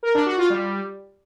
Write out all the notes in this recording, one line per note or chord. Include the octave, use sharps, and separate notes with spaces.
A#4
D4
F#4
F4
G3